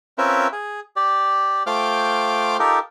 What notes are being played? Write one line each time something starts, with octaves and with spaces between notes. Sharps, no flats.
C4 C#4 F4 A#4 B4 E5
G#4
G4 D5
A3 F4 C5 G5 D6 F6
D#4 F4 G4 A4 A#4